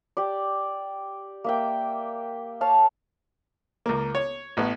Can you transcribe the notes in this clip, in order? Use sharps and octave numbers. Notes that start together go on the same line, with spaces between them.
G4 D5
A#3 E5 G5
C#5 F5 A5
C#2 A#3
C#5
A1 B3